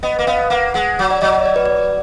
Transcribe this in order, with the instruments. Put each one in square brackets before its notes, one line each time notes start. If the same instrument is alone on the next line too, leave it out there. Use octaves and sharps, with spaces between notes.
[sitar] B3 [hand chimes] D#5
[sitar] A#3
[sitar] B3 [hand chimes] F5
[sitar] A#3 [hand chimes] F#5
[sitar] G#3 [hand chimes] F#5
[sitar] F#3
[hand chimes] D5
[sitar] F#3 [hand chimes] D#5
[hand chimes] D5
B4
D5